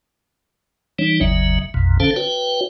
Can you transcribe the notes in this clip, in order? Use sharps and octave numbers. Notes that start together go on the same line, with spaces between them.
E3 G3 D4 D#4 C#5
G1 D#2 C#3 F#3 E5
A#1 F2 B2
D3 C#4 A4 C5 F5 A5
F#4 B4 C#5 G5